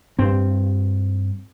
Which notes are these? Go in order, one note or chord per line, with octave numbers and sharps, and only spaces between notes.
G2 C4